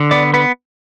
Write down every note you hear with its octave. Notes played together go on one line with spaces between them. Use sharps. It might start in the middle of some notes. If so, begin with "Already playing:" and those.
Already playing: D3
B3 D5
B3 B4